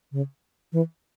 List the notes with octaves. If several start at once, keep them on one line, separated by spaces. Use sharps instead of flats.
C#3
E3